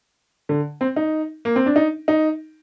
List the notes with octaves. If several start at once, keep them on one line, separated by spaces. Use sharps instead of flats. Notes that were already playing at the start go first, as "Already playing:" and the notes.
D3
C4
D#4
A#3
C4
D4
D#4
D#4